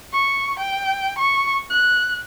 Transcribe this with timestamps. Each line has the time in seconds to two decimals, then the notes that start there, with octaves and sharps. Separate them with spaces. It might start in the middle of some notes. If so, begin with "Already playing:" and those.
0.13 C#6
0.59 G5
1.18 C#6
1.70 F#6